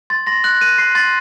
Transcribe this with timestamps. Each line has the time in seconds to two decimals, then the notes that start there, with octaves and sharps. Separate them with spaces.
0.10 C6 A6
0.27 C6 A#6
0.44 F#6 F#7
0.61 F#6 D#7
0.78 C6 C7
0.95 C6 A6